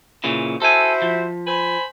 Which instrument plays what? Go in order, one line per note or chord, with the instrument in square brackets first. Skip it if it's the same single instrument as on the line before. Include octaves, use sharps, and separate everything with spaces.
[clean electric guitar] A#2 C#3 E3
[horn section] E4 F#4 C5 [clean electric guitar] A4 G#5
[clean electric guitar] F3
[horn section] C5 G#5 B5